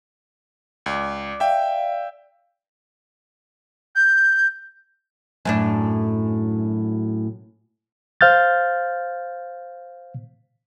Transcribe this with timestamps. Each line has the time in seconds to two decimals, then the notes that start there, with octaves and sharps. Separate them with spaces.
0.86 C#2 D5 D6
1.40 D5 E5 F5 G5
3.95 G6
5.45 F#2 A2 D4
8.21 C5 F5 F6 G6 A6